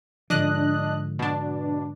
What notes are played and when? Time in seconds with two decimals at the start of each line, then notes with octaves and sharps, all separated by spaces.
0.30 G#2 D3 F3 D4 D#5 F#6
1.19 B2 D4